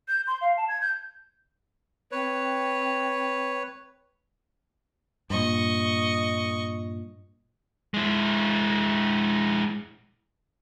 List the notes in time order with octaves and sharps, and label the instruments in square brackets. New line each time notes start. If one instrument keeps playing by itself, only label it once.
[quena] G6
C6
F5
A5
G#6
G6
[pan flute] C4 [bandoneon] B4 C#5
[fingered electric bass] G2 A#2 [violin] D#5 C#6
[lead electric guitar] G#3 E4